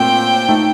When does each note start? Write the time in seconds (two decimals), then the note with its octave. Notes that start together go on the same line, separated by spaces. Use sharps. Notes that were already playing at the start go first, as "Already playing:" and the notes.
Already playing: A#2 A3 C4 F4 G5
0.48 A3 D#4 A4